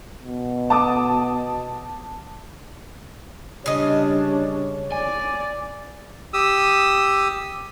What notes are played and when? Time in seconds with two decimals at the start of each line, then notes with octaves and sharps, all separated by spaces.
0.23 B2
0.70 A5 D6 D#6
3.66 C#3 G3 D4 C#5 D#5
4.92 D5 G#5
6.33 G4 D#6 E6